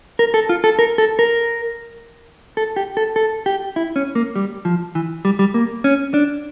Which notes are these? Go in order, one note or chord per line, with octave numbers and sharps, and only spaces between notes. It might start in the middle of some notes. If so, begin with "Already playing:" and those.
A#4
A4
F4
A4
A#4
A4
A#4
A4
G4
A4
A4
G4
E4
C#4
A#3
G3
F3
E3
G3
G3
A#3
C#4
D4